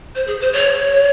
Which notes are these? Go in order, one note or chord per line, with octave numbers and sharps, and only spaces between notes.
C5
G#4
C5
C#5